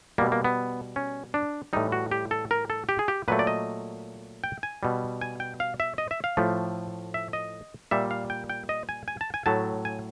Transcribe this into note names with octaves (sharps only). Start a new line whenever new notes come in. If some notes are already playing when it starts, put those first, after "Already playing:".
B2 G3 A#3
A#3
B3
C#4
D4
A2 E3 G3 D#4
F#4
G4
A4
A#4
A4
G4
G#4
G4
A#2 F#3 A3 B4
D5
D#5
G5
G#5
B2 G3
G#5
G5
F5
E5
D#5
E5
F5
A2 F3 A3
E5
D#5
A#2 G3 E5
F5
G5
G5
D#5
G#5
G#5
A5
G#5
A2 F#3 A3 A5
G#5